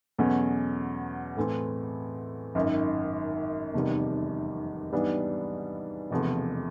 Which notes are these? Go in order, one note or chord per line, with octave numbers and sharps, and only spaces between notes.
E2 B2 F#3 A3 C#4
A2 E3 A3 C4
G#1 F#2 D#3
F1 E2 C3 D#3 G3
G#2 E3 G3 B3 D4
E1 E2 C3 F3 A3